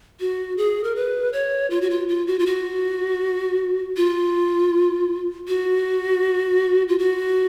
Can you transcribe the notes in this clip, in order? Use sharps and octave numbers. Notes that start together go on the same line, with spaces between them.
F#4
G#4
A#4
B4
C#5
F4
F#4
F4
F4
F#4
F4
F#4
F4
F#4
F4
F#4